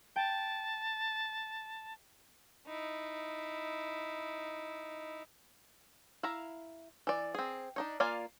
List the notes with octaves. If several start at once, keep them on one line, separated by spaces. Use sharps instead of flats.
G5 A5
D#4 E4
E4 E5 F5 A#5
E3 D5
C4 G#4
D4 D#4 C#5
A#3 F4 D5 F5 G#5